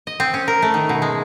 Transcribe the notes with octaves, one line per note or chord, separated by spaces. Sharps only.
D#5
C4
C#4
A#4
A3
D#3
B2
G#3